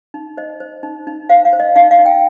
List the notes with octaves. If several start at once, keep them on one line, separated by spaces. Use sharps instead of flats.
D#4
C5 D#5
C5
D#4
D#4
C5 F5
F5
C5
D#5
D#4 F5
F5
D#4
G5